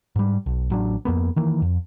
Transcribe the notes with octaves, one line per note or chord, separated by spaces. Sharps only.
G#2 G3
B1
A1 F#3 D4
F2 A#3 B3
D#3 E3 A#3
F2